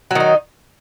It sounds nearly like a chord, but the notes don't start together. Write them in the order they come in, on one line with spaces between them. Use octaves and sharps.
F#3 D#3 D#4